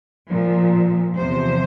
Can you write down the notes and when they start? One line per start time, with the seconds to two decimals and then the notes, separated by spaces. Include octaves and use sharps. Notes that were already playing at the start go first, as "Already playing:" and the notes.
0.29 A#2 F3
1.15 E2 C3 F3 C5